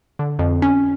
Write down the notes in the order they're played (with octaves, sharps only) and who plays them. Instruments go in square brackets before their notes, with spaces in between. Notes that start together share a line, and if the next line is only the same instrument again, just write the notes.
[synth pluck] D3
F2
C#4